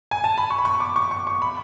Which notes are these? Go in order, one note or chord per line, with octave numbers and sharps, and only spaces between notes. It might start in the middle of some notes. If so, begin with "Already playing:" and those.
G#5
A5
B5
C#6
B5
C#6
D6
C#6
C#6
C#6
B5